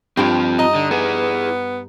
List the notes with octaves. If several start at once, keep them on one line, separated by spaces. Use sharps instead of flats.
G2 C4 F4 G5
D#4 D#5
D3
B3 E4 G#4